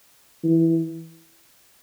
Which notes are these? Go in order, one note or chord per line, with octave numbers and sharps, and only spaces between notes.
E3